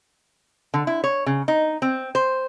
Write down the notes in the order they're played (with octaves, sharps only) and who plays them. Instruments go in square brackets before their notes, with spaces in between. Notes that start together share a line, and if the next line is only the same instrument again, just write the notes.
[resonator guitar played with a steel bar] D3
E4
C#5
C#3
D#4
C4
C5